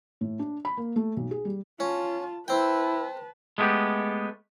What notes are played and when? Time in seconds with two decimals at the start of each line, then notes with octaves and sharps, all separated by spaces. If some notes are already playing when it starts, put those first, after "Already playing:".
0.21 A2
0.39 D4
0.65 B5
0.77 A#3
0.96 A3
1.17 B1
1.31 G#4
1.45 G3
1.80 C#4 F4 A5
2.48 C4 E4 B4 G5 A5
3.58 G#3 A3 B3 F#4 G4